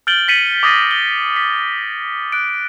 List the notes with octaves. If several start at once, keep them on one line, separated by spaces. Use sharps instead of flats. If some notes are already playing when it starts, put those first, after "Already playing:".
F6 G6 A6 D7 F#7 G7
A6 B6 C#7 D#7 F#7
D6 D#6 A6 A#6 C7 D#7
G7
B6
F#6 D7